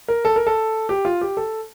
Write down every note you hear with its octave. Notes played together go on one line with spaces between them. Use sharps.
A#4
A4
A#4
A4
G4
F4
G4
A4